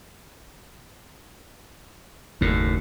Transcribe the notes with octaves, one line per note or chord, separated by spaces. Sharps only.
F#1 D#2 A2